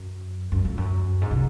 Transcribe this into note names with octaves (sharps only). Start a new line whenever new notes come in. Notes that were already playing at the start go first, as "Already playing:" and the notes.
Already playing: F#2
F#2
F2
F#2
G#2
C3